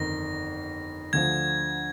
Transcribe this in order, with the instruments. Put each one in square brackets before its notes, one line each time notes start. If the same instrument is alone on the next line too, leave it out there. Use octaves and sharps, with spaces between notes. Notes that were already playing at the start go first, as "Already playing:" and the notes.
Already playing: [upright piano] G1 F2 D#3 [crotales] A#6
[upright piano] D2 D3 F3 [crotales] G#6